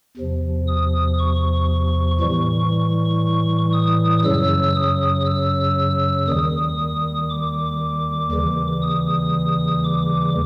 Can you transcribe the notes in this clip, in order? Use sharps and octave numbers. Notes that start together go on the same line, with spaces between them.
E2 C3 F3
D#6
C#6
A2 E3 G3 C#6
D#6
F#2 C#3 F#3 E6
D#6
E6
D#2 D#3 G3 D#6
D6
D#2 C#3 E3 G3
D#6
D6